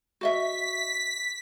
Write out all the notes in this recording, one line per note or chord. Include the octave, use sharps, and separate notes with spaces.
F#4 D#5 E5 B6